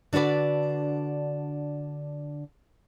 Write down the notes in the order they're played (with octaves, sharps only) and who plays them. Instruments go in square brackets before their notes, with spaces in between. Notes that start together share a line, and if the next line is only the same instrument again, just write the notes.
[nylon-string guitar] D3 D4 F#4 B4 D5